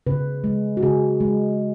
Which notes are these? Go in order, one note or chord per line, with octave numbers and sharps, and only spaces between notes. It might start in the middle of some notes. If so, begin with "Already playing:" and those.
C#3 B4
G#3
F#4
C#3 G#4
G#3